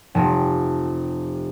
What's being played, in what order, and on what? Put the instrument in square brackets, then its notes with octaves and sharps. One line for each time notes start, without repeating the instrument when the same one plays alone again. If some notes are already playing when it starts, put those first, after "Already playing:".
[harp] F1